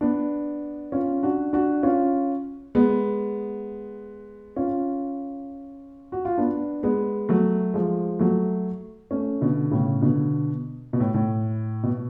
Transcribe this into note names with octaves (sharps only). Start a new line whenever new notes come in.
B3 D4
C#4 F4
D4 F#4
D4 F#4
C#4 F4
G#3 B3
C#4 F4
F#4
F4
B3 D4
G#3 B3
F#3 A3
F3 G#3
F#3 A3
A3 C#4
B2 D3
A2 C#3
B2 D3
B2
A2
A2
B2